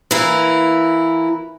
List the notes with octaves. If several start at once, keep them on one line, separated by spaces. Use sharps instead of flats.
E3 A#3 E4